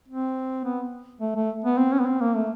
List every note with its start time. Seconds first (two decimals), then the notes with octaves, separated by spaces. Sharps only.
0.08 C4
0.65 B3
1.21 A3
1.36 A3
1.65 B3
1.78 C4
1.93 C#4
2.00 B3
2.07 C4
2.21 A#3
2.36 A3